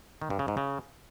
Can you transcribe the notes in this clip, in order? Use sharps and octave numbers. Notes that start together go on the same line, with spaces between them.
D#3
G2
C#3
G#2
C#3